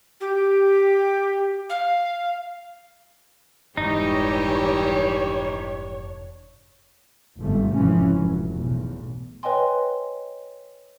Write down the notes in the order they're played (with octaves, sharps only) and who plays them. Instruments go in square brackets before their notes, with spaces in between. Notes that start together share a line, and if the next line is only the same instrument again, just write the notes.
[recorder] G4
F5
[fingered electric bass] F1 G#2 [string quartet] E3 G3 G4 [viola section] D4 C#5 [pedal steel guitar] D#4
[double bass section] G1 G#2 C3 F3 A3
F1 G#2 C#3 E3 F3 C#4
F1 F#3
B1 E2 A2
[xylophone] B4 C#5 D#5 G5 G#5 C6